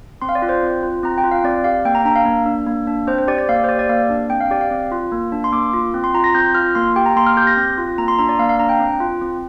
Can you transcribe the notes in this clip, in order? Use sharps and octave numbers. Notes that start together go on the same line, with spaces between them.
C4 C6
F5
D5
F4
C5
C4
F4
C4 A#5
G5
F4
F5
C4 D5
G4 F5
A#3 G5
A#5
D4 A#5
F5
A#3
D4
A#3
D4
C4 C5
C5
G4 D5
D5
A#3 F5
C5
G4 D5
D5
A#3 F5
D4
C4 G5
F5
G4 D5
F5
C4
F4
A#3
D4
C6
A#3 D6
F4
C4
C6
F4 A#5
A#6
C4 G6
F4 F6
A#3 C6
G4 G5
A#5
A#3 C6
F6
G4 G6
A#6
C4
F4
A#3 A#5
C6
D4 A#5
D5
A#3 F5
F5
D4 A#5
G5
C4
F4
C4